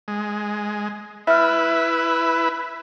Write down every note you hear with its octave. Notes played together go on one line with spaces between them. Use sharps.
G#3
E4 B4 E5 F6